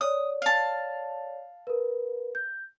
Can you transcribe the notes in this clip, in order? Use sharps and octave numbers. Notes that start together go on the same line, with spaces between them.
C#5 D5 D#6
F5 A5
A#4 B4
G6